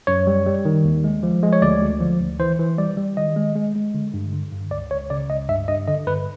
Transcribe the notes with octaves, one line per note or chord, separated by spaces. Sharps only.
F#2 C#5
G3
G3
D#3
D#2
G#3
F3
G#3
C#5
D2 D5
D2
F3
D2
E3 C5
E3
G3 D5
G3
D#3 D#5
G#3
G#3
G#3
D3
G2
D3
G2
C#2 D5
C#2 C#5
C#3 D5
C#2 D#5
G2 E5
G2 D#5
D3 D#5
G2 B4